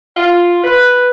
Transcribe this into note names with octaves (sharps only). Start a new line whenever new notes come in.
F4
B4